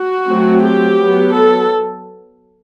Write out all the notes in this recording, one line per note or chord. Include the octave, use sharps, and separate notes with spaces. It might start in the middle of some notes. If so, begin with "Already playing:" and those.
Already playing: F#4
F#3 A3 C4
G4
F#3 B3
A4